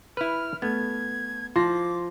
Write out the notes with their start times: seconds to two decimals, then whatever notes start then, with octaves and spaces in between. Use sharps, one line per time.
0.17 E4 B4 F6
0.62 A3 B3 G#6
1.56 F3 C6 D6 A#6